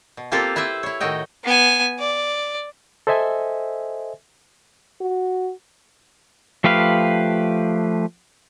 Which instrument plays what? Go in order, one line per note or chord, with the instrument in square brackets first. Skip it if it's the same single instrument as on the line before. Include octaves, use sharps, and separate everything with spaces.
[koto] B2
A#3 C4 F4 G4 A4
E4 B4 C5 E5 G5
E4 C#5
A2 D#3 F#4 D#5 G5
[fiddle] B3 G#5
D5
[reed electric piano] A4 C5 D#5 E5 G#5
[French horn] F#4
[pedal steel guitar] F3 A3 G4 B4 F5